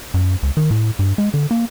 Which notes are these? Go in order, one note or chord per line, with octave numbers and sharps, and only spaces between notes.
F#2
C#2
D#3
A2
G2
G#3
D3
A#3